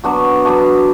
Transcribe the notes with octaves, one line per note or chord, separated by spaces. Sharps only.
F#3 B3 D4 F#4
F#3 B3 D4 F#4